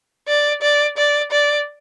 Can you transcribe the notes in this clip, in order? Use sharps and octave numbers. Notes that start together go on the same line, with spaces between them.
D5
D5
D5
D5